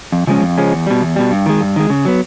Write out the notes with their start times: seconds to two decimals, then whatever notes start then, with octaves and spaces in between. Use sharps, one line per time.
0.12 F2
0.27 C#3 F3 G#3 C#4
0.42 F2
0.58 C#3 F3 G#3 C#4
0.72 E2
0.87 B2 G3
1.01 E2
1.16 B2 G3
1.31 G2
1.46 D#3 G#3
1.61 G2
1.76 D#3 G#3
1.90 C#3
2.05 F#3 B3